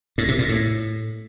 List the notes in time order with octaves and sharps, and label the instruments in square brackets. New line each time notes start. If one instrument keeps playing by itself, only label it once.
[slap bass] A2
C3
A#2
A2